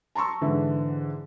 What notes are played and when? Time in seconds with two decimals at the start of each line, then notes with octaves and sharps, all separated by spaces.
0.15 A5 A#5 C6 C#6 E6
0.41 G#2 D3 E3